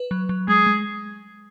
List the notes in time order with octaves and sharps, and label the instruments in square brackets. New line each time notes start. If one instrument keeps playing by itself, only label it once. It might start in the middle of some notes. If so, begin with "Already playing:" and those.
Already playing: [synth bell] B4
F#3
F#3
[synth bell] G#3 [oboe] G#4
[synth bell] G#3